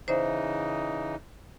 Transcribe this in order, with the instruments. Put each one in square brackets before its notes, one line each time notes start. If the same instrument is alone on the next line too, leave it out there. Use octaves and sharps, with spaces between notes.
[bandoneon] C#3 E3 D#4 [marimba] C5 D5 E5